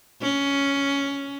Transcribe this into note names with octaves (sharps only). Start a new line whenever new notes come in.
C#4